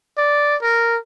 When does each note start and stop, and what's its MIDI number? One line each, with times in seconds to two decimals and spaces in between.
0.18 0.56 74
0.62 0.98 70